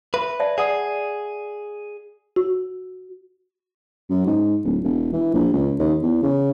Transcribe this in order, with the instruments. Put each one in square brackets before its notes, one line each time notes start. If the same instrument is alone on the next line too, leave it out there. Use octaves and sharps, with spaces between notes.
[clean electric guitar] B4 [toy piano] E5
[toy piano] D5 E5 A5
[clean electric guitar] G#4 [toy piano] D5 F#5 D#6
[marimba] F#4
[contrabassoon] F#2
G#2
D1
E1
E3
A#1
C#2
D#2
E2
C#3